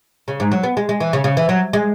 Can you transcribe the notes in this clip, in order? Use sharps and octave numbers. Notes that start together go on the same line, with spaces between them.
C#3
G#2
F#3
B3
G#3
G#3
E3
C#3
C#3
E3
F#3
G#3